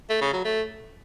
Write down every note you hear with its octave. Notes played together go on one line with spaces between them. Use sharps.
A3
C#3
F#3
A3